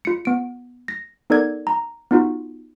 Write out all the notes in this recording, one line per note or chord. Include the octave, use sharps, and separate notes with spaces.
F4 C#7
B3 D7
A#6
B3 D#4 A4 A#4 D5 G#6
A#5
B3 D#4 F4 F#4